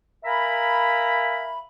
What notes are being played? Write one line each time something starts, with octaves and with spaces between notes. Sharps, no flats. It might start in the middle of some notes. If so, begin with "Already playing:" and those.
A#4 E5 F5 G#5 A#5 B5